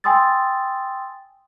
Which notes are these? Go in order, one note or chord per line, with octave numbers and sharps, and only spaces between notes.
G5 G#5 C6 D#6 E6 A6